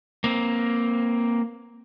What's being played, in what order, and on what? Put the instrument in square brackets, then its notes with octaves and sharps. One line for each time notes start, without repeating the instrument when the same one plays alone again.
[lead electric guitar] A#3 C4